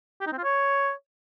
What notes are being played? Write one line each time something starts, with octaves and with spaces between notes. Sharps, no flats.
G4
D#4
C4
F4
C#5